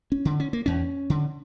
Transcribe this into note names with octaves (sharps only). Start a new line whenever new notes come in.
C#4
D3
C#4
A#3
E2 C#4
D3